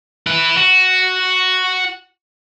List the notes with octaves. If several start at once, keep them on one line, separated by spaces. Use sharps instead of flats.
E4 B4
F#4